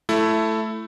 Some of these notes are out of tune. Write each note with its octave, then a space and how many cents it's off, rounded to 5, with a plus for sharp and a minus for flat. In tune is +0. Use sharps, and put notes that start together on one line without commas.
A3 +0 E4 +15